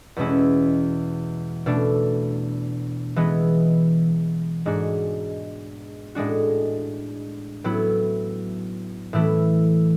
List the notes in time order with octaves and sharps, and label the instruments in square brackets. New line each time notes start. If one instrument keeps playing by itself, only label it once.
[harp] E2 B2 G#3 C#4 E4
B2 A3 D4
E3 G#3 B3
G#2 G#3 D4 F#4
A2 G#3 D4 F#4
A2 F#3 B3 E4
A2 E3 A3 E4